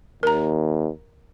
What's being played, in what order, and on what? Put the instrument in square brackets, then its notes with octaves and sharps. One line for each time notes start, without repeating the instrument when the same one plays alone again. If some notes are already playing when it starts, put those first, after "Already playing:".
[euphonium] D#2 [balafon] A#4 A#5